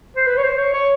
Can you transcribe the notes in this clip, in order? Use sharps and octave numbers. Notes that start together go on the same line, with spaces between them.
C5
B4
C#5
C5
C#5
C#5